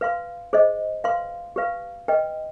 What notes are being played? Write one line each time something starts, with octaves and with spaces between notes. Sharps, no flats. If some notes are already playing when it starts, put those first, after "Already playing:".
B4 F5 C6
G#4 C5 D#5
B4 F5 C6
G4 B4 F5
B4 D#5 G5